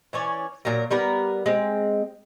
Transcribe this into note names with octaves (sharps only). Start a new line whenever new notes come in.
E3 C#4 C#5 D5
A#2 F#3 A#4
G3 B3 A#4 B4
G#3 C4